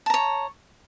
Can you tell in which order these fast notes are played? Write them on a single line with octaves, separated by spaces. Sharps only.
A5 A#5 C#5